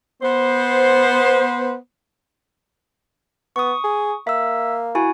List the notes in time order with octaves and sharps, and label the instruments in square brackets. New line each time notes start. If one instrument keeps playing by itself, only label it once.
[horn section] B3 C5
[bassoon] B3 [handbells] C#6 D#6
[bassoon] G#4
[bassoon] A#3 [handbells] E5 E6
[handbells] E4 F#4 G#5